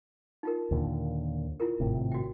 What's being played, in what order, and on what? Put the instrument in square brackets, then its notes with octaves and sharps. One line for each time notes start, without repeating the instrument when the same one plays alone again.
[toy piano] D#4 F4 A#4
[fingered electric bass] D#2 A#2 D3
[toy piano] E4 F4 A#4
[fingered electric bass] G#1 A2 C3
[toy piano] F#4 G5